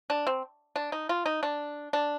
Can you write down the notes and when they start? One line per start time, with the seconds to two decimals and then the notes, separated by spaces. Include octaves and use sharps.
0.10 D4
0.27 C4
0.76 D4
0.92 D#4
1.09 F4
1.26 D#4
1.43 D4
1.93 D4